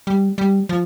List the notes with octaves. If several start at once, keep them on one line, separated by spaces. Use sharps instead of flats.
G3
G3
F3